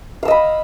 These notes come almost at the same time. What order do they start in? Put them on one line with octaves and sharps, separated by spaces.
F5 E6 D#5 B5